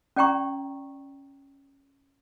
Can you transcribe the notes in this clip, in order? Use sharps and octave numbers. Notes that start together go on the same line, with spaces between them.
C#4 D5 G5 A#5 C#6